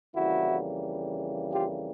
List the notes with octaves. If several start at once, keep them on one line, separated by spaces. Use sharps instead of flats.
F2 C#3 E3 G3 A#3 E4 F#4
F4 G4